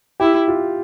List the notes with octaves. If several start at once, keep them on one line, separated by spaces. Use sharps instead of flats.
E4 G4
F4